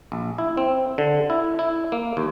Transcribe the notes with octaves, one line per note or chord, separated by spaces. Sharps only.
A#1
E4
C4
D3
E4
E4
A#3
D#2